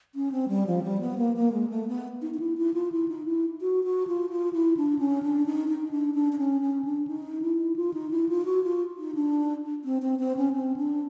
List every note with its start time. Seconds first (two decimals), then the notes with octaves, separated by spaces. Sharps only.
0.15 C#4
0.32 C4
0.49 G3
0.67 F3
0.84 G3
1.01 B3
1.18 A#3
1.36 A#3
1.52 G#3
1.70 A3
1.88 B3
2.22 D#4
2.34 D#4
2.39 E4
2.57 E4
2.74 F4
2.92 E4
3.08 D#4
3.26 E4
3.61 F#4
3.84 F#4
4.07 F4
4.30 F4
4.53 E4
4.77 D4
4.99 C#4
5.23 D4
5.46 D#4
5.68 D#4
5.91 D4
6.14 D4
6.32 D4
6.38 C#4
6.61 C#4
6.85 D4
7.07 D#4
7.42 E4
7.76 F4
7.94 D#4
8.11 E4
8.29 F4
8.45 F#4
8.64 F4
8.98 D#4
9.15 D4
9.85 C4
10.02 C4
10.19 C4
10.37 C#4
10.53 C4
10.76 D4